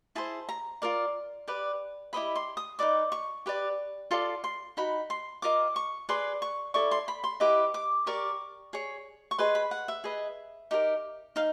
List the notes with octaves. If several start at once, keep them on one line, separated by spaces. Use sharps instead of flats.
E4 G#4 C5 A5
A#5
F4 A#4 D5
G4 B4 D5
E4 G4 C5 D#5 B5
C6
D#6
D#4 F#4 B4 D5 D6
C#6
G4 B4 D5
F4 A4 D5 C6
C6
D#4 F#4 B5
C6
F4 A#4 D#5 D6
C#6
G#4 B4 D5 C6
C#6
E4 A4 D5 C#6
C6
B5
C6
E4 G4 B4 D#5 D6
D6
G4 A#4 D5 C#6
G#4 C#5
C#6
G#4 B4 D#5 C6
B5
F#5
E5
G#4 B4 D#5
D#4 G4 A#4
D#4 F5